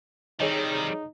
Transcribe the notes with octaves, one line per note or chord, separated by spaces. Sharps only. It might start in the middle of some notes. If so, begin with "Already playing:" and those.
D#3 G3 C4 D#4 G#4 C#5 D#5